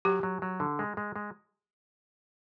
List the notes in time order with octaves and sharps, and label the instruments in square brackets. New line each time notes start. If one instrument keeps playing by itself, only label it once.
[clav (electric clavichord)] F#3 [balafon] G4
[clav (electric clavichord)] F#3
F#3
D3
G#3
G#3
G#3